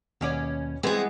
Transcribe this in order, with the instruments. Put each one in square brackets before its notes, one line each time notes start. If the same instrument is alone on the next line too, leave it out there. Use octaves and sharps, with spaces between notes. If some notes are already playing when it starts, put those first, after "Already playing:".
[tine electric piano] D#2 [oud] B2 C#4 D5
[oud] E3 G#3 B3 [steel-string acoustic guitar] C4 G#4